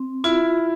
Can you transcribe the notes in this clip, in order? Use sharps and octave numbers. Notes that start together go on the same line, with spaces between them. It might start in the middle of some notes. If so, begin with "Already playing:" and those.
Already playing: C4
E4 F4